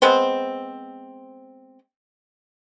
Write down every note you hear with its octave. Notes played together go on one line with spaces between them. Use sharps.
G#3 B3 C4 C5